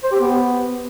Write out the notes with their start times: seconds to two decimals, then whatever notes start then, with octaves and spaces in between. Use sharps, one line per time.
0.04 C5
0.12 G4
0.20 B3